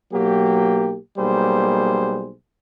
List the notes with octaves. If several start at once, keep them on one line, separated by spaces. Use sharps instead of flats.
B1 F#3 A#3 G4
B1 G3 A#3 G#4 C5